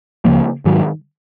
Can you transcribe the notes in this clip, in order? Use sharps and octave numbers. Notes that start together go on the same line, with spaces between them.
C#2 C#3 F3 A#3
G#2 D#3 F#3